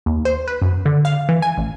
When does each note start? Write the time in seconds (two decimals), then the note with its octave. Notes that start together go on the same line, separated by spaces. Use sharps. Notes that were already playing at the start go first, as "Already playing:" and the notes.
0.06 D#2
0.25 C5
0.48 B4
0.62 F#2
0.85 D3
1.05 F5
1.29 E3
1.42 G#5
1.58 A1